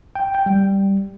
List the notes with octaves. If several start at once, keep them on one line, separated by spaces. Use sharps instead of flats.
G5
G5
G3